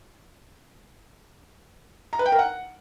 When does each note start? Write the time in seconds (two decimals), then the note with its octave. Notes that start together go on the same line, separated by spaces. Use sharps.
2.13 A#5
2.19 B4
2.26 G5
2.32 A#4
2.39 F#5